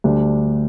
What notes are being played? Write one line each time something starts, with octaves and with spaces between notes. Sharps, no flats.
D2 D3 G3 D4